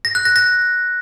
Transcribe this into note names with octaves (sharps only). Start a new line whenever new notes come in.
A#6
F#6
A#6
A#6